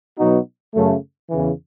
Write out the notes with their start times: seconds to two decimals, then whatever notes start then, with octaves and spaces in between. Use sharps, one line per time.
0.18 B2 F#3 B3 D#4 F#4
0.74 F#2 C#3 F#3 A3
1.29 E2 C#3 E3